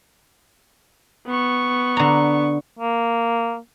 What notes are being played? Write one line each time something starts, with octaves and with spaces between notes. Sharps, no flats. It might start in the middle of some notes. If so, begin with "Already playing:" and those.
B3 C#6
D3 A#5
A#3